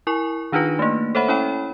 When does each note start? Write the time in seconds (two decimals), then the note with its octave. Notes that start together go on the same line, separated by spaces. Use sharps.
0.07 E4 A#4 G#5 C#6
0.52 D#3 D4 D#4 F4 B4 A#6
0.79 A3 A#3
1.15 A4 C5 C#5 E5 F#5 B5
1.28 C#4 E4 C#5 G5 B5